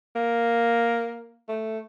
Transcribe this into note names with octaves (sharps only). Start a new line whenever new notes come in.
A#3
A3